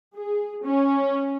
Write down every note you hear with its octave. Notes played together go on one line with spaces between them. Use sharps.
G#4
C#4